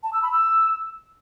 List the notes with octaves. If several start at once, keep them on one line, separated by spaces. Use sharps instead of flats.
A5
E6
B5
E6